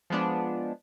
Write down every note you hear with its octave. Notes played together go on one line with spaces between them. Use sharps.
F3 G#3 B3 D4